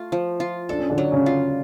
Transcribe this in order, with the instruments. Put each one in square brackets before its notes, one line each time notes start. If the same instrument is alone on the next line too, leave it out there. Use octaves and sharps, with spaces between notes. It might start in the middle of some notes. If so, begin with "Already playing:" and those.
Already playing: [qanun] A3 F4
F3
F4
[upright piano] D4 [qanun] A4
[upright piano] C#4
D3 D4
[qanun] F#3
[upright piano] C#3 C#4
[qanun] F4